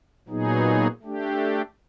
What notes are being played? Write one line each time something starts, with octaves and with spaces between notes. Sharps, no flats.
A#2 F#3 B3 D#4 G#4
A3 D4 G4